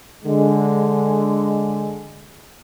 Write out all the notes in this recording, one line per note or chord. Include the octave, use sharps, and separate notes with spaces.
D3 G#3